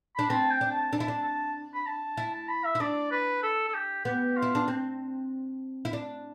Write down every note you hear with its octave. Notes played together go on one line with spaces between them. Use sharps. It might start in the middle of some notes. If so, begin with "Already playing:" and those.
D4 B5
C4 A5
G5
D4
A5
D4 A5
E4
D4
A5
B5
A5
E4 A5
A5
B5
E5
E4
D4 D5
B4
A4
A4
G4
B3 G4
F4
E4
D4
C4
E4
D4